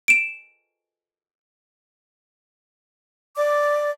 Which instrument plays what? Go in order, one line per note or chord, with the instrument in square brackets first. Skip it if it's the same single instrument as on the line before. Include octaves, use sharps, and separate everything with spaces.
[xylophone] D7 E7
[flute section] D5 D6